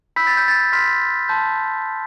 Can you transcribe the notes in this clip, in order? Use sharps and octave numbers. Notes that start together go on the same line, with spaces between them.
B5 E6 G6 B6
A6
G6
A6
C6 F6 B6
A5 C6 G6